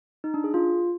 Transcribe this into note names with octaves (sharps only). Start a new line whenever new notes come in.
D#4
D4
G#4
F4